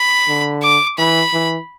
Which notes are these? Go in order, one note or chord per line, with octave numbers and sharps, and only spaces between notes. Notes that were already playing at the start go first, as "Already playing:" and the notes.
Already playing: B5
D3
D6
E3 B5
E3